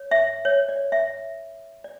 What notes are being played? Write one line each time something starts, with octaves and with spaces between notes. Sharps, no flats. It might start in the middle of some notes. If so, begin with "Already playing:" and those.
Already playing: C#5
E5
C#5
D5
E5
D5